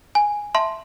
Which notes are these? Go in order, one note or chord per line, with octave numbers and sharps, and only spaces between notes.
G#5
E5 A5 C6